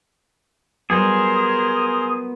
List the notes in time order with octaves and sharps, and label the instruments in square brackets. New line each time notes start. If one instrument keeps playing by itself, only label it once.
[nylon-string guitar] F#3 G3 [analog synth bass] B3 [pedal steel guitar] G#4 [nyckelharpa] A#4 C5